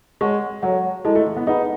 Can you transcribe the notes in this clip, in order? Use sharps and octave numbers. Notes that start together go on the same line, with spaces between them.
G#3 C#5 F#5 A5 C#6
F#3 A4 C#5 F#5
G#3 E4 A4 D#5 A5
A3
E3
B3
D#4 G#4 B4 F#5 B5